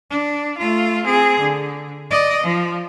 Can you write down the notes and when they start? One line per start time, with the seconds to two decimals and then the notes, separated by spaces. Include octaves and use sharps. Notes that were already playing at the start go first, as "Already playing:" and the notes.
0.10 D4
0.58 A3 F4
1.06 C4 G#4
1.41 D3
2.11 D5 D#5
2.44 F3